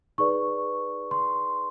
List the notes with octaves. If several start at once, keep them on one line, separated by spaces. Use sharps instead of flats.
D#4 G#4 B4 D5 C#6
C6